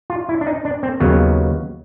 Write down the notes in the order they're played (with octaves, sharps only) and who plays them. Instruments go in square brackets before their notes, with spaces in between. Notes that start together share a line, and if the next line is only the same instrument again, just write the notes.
[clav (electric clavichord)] F4
E4
D4
D#4
D4
C4
D#2 C#3 F#3 A#3 B3